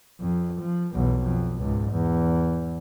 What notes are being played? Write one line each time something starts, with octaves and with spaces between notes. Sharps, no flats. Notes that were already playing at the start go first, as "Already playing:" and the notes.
F2
F3
B1 E2
F2
C#2 G#2
E2